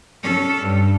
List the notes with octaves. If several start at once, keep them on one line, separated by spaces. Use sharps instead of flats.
C#4 A4
G2